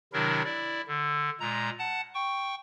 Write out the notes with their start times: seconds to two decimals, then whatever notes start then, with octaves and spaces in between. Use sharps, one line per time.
0.13 C3 D#3 F#3 D4 E4 A#4
0.45 E4 D5
0.87 D3
1.40 A#2 G#3 A#5
1.79 F#5 A5
2.15 G5 C#6